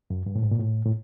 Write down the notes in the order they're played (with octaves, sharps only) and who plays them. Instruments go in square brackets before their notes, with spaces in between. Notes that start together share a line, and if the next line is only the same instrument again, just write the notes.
[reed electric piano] F#2
G2
A2
G#2
A#2
A2
A2